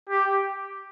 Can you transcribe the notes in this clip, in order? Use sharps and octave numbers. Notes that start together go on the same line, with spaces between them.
G4